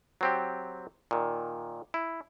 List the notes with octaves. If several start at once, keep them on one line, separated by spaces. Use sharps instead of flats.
F#3 C4 G4
A#2 D#3
E4